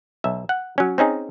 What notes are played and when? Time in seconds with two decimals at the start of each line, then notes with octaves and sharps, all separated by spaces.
0.24 B1 E5
0.49 F#5
0.78 F#3 C#4
0.98 C4 C#4 D#4 G#4